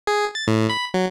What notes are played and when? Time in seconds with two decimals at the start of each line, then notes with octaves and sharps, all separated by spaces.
0.07 G#4
0.35 A6
0.48 A2
0.70 B5
0.94 F#3